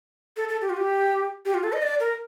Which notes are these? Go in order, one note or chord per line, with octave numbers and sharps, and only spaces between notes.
A4
A4
G4
F4
G4
G4
F4
A4
D#5
D5
A#4